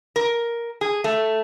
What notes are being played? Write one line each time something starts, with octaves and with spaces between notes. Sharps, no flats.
A#4
G#4
A3